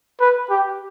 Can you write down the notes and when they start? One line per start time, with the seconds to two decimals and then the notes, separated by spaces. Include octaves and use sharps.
0.21 B4
0.50 G4